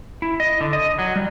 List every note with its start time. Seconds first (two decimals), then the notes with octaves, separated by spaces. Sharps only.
0.22 E4
0.40 D#5
0.61 D3
0.73 D#5
0.99 F#3
1.16 G3